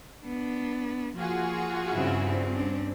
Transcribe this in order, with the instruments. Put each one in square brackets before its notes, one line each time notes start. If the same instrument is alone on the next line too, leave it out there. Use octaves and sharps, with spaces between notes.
[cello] B3 D4
[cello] F3 A#3 [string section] F4 F#4 G#4
[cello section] G2 C4 [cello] C#3 E4
[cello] C#4 D4